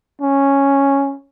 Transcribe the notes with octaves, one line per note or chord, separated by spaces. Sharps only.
C#4